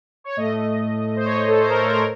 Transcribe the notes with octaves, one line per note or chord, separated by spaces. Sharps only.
C#5
A2 A3 D#5
C5
C#5
D#5
A4
C5
A#4
A4
A#4